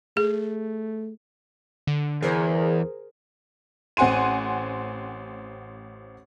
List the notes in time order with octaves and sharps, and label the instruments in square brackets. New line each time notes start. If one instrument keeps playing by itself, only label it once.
[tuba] A3 [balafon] G#4
[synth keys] D3
[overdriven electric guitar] E2 [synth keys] G#4 A#4 C5
[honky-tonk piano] A1 C4 F#5 G#5 C6 D#7